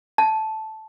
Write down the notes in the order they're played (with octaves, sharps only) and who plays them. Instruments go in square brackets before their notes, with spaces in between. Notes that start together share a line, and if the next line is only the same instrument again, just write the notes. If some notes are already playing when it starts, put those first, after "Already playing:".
[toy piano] A5